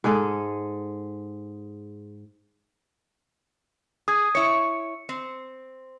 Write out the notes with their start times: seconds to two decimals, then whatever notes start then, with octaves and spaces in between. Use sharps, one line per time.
0.04 G#2 G#3 G#4 A4
4.08 G#4 D#6 G#6
4.35 E4 C#5 C#7
5.09 C4